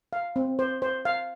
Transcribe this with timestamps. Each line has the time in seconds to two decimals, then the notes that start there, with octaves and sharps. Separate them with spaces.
0.13 F5
0.36 C4
0.59 C5
0.82 C5
1.05 F5